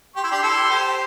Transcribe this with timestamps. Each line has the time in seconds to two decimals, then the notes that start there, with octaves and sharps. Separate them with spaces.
0.16 G4 C6
0.24 E4
0.31 D4 G4
0.43 E4 A4
0.70 G4 C5